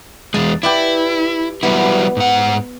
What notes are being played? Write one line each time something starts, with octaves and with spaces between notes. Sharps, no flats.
E2 G#3 A5
E4 G4 B4 D5
F#3 G3 B3 E4
G#2 F#5